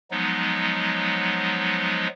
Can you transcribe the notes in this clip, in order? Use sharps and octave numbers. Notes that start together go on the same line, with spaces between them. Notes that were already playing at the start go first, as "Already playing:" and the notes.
F3 F#3 G#3 B3 D#4